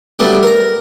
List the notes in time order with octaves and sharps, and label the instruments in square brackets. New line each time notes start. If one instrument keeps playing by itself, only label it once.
[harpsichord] F#3 G3 A3 B3 D4
A#4 A#5